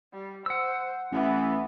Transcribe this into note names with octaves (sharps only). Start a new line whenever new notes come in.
G3
C5 F#5 E6
A1 E3 B3